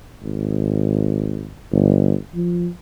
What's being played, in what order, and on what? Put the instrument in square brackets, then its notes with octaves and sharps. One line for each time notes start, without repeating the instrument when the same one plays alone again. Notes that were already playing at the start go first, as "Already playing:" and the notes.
[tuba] G#1
G1
F3